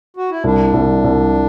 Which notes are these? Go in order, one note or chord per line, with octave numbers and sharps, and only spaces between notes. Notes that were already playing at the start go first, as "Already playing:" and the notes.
F#4
E4
C2 D4
C2
C2